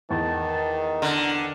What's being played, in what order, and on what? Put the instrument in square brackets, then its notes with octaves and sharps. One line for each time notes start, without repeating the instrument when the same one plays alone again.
[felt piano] E2 [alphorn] D#3 [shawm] A5
[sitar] D3 [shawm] A#4